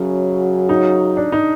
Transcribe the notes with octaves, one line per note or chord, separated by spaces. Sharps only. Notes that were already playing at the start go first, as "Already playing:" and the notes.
Already playing: F#2 C#3 F#3
D#4
D4
D#4